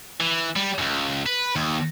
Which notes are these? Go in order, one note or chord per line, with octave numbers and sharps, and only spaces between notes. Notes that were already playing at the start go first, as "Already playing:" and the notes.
E3
G3
C#2 F#2
B4
D#2